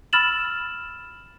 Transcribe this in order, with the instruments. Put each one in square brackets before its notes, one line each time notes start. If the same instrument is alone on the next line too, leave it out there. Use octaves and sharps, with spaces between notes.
[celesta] B5 E6 F6 A6 E7 F#7